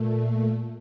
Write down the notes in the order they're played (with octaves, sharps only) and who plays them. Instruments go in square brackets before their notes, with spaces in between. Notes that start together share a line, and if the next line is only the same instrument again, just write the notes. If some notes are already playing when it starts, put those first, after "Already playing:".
Already playing: [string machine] A#2 A3